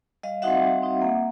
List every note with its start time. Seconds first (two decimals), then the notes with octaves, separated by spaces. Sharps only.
0.23 G3 D#5 F5
0.42 C4 D#4 F#4 E5 F#5
0.62 G3
0.82 C4 D#4 F#4
1.01 A#3